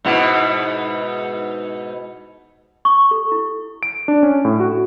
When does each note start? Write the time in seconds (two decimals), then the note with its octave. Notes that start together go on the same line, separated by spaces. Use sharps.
0.05 G#2 B2 E4
2.85 C#6
3.11 A4
3.32 E4
3.83 D7
4.08 D4
4.23 C#4
4.45 A2
4.60 F#4